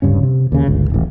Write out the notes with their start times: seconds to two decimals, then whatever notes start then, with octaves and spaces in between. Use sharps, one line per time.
0.02 D1 G2 C#3 C#4
0.23 C3
0.52 D#2 C#3
0.67 G1 C#2
0.90 D#1 A1